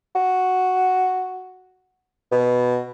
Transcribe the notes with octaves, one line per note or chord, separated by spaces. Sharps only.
F#4
B2